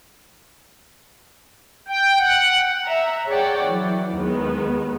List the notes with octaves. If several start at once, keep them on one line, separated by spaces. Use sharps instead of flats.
G5
F#5
E5 A#5
G#4 C#5 D5 F#5 G5
E3 F#3
D#2 D#3 G#3 B3